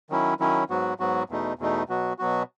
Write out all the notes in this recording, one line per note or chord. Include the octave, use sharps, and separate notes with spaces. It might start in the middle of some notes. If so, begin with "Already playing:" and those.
D#3 F#3 C#4 E4
D#3 F#3 C#4 E4
G#2 F#3 B3 F#4
G#2 F#3 B3 F#4
E2 B2 A3 D#4
E2 B2 A3 D#4
B2 F#3 B3 F#4
B2 F#3 B3 F#4